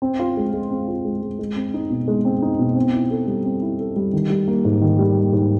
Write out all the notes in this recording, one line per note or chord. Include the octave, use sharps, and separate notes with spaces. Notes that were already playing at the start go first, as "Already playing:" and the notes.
C4
F4
G#3
G#3
C4
F4
G#3
G#3
G#3
C4
D#4
B2
G#3
C4
D#4
B2
C4
E4
A4
G3
C4
E4
A4
G3
D#3
G3
A#3
G#2
D#3
G3
A#3
G#2